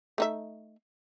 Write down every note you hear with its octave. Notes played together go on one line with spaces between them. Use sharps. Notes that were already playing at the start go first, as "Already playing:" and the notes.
A3 D#4 E5